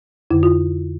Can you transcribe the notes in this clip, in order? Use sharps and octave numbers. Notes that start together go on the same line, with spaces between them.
F2 D3 E4
F4